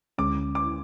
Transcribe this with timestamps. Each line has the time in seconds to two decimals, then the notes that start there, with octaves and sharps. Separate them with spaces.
0.18 D2 D3 G#3 C#4 D6
0.55 D6